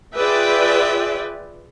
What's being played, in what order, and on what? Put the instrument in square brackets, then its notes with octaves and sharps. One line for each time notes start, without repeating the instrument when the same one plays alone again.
[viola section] F4 G#4 B4 D5 E5 G5